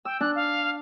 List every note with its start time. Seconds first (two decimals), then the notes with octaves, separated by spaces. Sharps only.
0.05 G5 E6
0.21 D4 F#6
0.35 F5